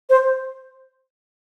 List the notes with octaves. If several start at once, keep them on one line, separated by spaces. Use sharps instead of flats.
C5